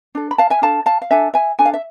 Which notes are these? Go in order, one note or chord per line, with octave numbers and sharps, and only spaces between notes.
D4 A4
B5
F5 A5
E5 G#5
D4 A4 F5 A5
F5 A5
F5
D4 A4 E5 G#5
E5 G#5
D4 A4 G#5
F5
E5